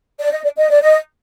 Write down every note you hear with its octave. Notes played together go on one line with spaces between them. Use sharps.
D5
D#5
D5
D#5
D5
D#5